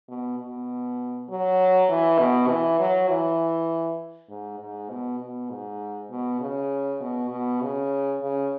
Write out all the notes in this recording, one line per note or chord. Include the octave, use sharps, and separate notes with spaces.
B2
B2
F#3
E3
B2
E3
F#3
E3
G#2
G#2
B2
B2
G#2
B2
C#3
B2
B2
C#3
C#3